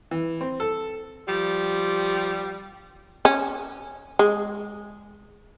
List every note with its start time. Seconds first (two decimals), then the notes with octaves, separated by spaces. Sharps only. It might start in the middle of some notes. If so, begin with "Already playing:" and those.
0.11 E3
0.41 C4
0.60 A4
1.27 F3 G3
3.25 C#4
4.19 G#3